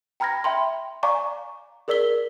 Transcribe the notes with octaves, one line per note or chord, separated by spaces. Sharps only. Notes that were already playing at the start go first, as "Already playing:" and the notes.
G5 A#5 B5 F6 G#6 A#6
E5 G5 B5 C6
D5 F5 G#5 A#5 C#6 D6
G#4 A#4 D5 E6 B6 G7